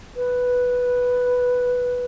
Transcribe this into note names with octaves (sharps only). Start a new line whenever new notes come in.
B4